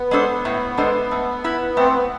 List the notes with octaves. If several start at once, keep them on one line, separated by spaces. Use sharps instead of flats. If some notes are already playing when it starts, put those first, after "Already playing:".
Already playing: B3
G#3 D4 A4 C5
A2
G#3 D4 A4 C5
A3
E4 B4
A3 C4
B3